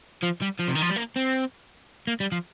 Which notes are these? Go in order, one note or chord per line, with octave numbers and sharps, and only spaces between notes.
F3
G3
F3
C3
D#3
F3
G3
A#3
C4
A#3
G3
F3